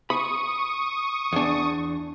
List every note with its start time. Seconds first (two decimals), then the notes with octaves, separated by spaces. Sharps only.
0.10 B5 C#6 D#6
1.33 E2 D4